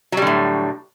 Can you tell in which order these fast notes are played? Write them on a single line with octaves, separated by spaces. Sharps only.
F#3 G3 D3 A2